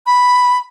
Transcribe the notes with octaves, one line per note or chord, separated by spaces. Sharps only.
B5